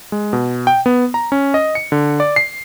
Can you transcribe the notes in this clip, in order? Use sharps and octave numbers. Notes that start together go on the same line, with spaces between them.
G#3
B2
G5
B3
A#5
C#4
D#5
C#7
D3
D5
C7